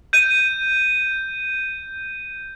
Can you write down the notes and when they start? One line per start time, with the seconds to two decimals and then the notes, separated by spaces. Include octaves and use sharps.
0.13 G6 D#7